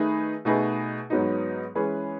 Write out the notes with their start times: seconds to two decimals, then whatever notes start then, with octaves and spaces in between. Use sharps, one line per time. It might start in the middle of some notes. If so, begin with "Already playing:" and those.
Already playing: D#3 A3 D#4 G#4 B4
0.45 B2 A3 D#4 G#4 B4
1.10 G#2 F#3 B3 D#4
1.75 E3 G#3 C#4 G#4 B4